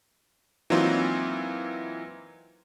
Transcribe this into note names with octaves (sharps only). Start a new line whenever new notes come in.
E3 F#3 A#3 C4 D#4 F4